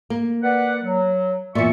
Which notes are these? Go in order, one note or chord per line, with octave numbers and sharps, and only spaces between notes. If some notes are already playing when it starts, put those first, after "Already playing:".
A#3
B4 D5 F#5
F#3
E2 A#2 E5 C#6